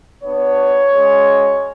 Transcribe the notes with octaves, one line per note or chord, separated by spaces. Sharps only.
B3 D4 F#4 C#5
G#3 C#4 F#4